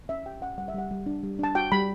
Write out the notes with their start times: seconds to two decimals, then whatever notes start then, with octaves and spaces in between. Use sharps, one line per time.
0.09 C#4 E5
0.26 G4 G5
0.41 C#4 F#5
0.58 G3 F#5
0.68 E5
0.74 G3 F#5
0.91 G3
1.06 D4
1.23 G3
1.39 D4 A5
1.55 F#4 G5
1.71 G3 B5